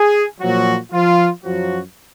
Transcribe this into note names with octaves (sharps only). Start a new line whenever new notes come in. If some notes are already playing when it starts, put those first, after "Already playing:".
Already playing: G#4
A#2 F3 F#3 F#4
F3 F4
F#2 F3 F#3 F#4